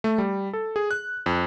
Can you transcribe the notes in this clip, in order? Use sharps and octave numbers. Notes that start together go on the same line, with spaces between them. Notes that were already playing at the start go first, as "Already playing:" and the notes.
A3
G3
A4
G#4
F#6
F2